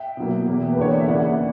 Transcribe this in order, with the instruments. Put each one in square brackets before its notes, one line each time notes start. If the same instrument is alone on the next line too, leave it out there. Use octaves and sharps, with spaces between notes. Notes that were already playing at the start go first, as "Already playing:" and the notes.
Already playing: [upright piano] E5 G5
B2 F#3 A#3
E2 B2 A#3
B4
E2 D3 A#3 C#5
D5
E5
C#3 E3 A#3 D5 F#5